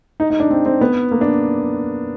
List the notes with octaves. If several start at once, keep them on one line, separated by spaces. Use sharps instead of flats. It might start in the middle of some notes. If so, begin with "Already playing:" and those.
D#4
D#4
D4
C4
C4
B3
A#3
D4